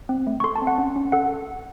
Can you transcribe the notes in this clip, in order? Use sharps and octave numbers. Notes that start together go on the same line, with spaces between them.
C4
A3
C#6
A4 C6
A5
C4
F#5
C#4
C#4
A4 F#5